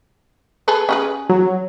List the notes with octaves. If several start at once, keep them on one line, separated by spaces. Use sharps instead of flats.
G#4 A4 B4
C#4 G#4 B4
F#3